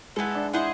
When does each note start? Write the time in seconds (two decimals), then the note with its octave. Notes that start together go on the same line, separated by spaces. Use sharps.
0.16 G#3 B3 E4 A4
0.35 D4
0.53 E4 G#4 C5 D#5 F#5